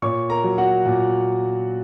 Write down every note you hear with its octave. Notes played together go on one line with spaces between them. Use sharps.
A#2 C#5 C#6
A#4 A#5
F#3
F#4 F#5
A#2